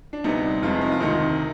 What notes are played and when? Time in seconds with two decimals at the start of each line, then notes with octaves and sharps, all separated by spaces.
0.13 D4
0.24 D2 C3 G3 B3 D#4
0.62 F1 F2 C3 F3 G#3 F4
0.81 D#4
0.92 F4
1.00 D2 C3 D#3 D#4